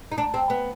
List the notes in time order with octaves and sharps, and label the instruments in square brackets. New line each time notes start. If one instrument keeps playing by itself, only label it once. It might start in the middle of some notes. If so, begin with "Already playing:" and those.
[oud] D#4
D4
C4
B3